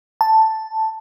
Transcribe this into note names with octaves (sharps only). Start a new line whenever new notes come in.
A5